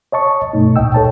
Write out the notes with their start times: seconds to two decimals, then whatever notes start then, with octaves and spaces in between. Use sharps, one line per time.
0.12 C#5 D#5 A5 C#6
0.53 G2 B2 A3 D#4
0.76 C#2 A#2 D#5 G5 E6
0.94 A4 C#5 A5